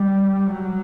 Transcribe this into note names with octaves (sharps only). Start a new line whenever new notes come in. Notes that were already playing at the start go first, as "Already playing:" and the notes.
Already playing: G3
F#3